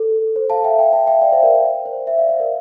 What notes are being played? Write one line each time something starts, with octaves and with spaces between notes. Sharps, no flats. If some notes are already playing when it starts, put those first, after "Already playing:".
Already playing: A4
C5
F5 A5
E5 G5
E5 G5
F5 A5
E5 G5
D5 F5
C5 E5
A#4 D5
C5
C5
C5 E5
D5 F5
C5 E5
A#4 D5